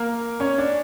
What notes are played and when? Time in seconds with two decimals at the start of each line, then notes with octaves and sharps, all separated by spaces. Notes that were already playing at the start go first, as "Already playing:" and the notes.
Already playing: A#3 A#4
0.40 C#4 C#5
0.58 D4 D5